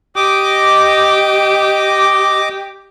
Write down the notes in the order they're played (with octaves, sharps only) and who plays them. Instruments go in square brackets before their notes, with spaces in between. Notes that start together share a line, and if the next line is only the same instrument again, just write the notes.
[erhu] G4 [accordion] D#5 D6